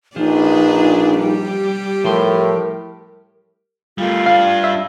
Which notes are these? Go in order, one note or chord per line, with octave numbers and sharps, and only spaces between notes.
A#1 F3 D4 D#4 G#4 B4
G3 G4
A2 F3 A#4 C6
G3 A3 F4
G3 D4 F5
E5